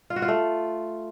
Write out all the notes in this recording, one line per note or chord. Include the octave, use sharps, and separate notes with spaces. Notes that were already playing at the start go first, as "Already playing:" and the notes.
F4
F#4
F4
A3